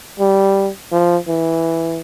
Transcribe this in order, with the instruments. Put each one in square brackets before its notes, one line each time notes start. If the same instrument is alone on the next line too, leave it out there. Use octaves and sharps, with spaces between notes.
[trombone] G3
F3
E3